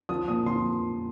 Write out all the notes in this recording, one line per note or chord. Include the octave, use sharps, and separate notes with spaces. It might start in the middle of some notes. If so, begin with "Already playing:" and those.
F3 D#6
A#2 D#6
F3 C6